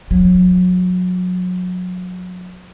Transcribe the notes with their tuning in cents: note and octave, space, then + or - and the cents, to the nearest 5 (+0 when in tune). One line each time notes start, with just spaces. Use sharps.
F#3 -30